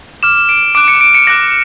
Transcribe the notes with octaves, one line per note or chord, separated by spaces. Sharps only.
D6 F6 E7
D7
D6 F#6 D7
C#7
D7
C#7
D6 F#6 A#6